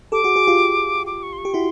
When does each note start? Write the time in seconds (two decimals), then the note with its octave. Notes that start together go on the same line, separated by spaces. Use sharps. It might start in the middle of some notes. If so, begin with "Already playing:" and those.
0.12 G4 A4 D6
0.24 F#4 G#4
0.36 F#4 G#4
0.47 F4 G4
1.07 D6
1.23 C#6
1.33 C6
1.38 C#6
1.45 G4
1.54 E4 F#4 C6